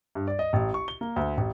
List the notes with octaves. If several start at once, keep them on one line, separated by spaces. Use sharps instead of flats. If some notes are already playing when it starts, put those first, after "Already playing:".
G2
D5
D#5
A1
C#6
G7
A#3
D2
A1